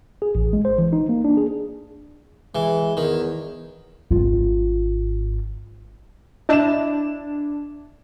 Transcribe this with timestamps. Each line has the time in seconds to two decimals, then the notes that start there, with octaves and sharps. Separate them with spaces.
0.22 G#4
0.35 A1
0.53 G#3
0.65 C5
0.78 E3
0.93 D#4
1.09 A#3
1.25 D4
1.37 G#4
2.55 E3 G#3
2.97 E2 D#3
4.11 G#1 F4
6.49 D4 E4 D#5 E6 G6 E7